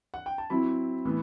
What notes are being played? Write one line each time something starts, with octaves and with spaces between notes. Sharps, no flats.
F#5
G5
A5
F#3 C4 E4 B5
A2 E3 B3